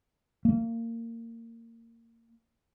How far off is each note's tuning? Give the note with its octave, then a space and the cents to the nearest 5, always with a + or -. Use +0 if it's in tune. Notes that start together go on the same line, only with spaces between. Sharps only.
A#3 -25